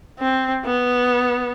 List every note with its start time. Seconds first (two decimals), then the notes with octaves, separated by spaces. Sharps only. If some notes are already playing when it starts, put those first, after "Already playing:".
0.19 C4
0.65 B3